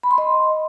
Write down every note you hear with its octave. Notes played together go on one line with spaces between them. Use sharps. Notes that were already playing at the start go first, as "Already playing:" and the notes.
B5
C6
D#5